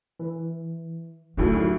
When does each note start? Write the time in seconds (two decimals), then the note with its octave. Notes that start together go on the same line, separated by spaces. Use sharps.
0.20 E3
1.37 D2 A2 D#3 F#3 C#4 G4 A4